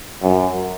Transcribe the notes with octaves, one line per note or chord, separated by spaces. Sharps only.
F#2